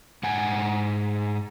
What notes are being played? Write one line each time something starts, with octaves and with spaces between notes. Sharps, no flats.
G#2 F#5 G#5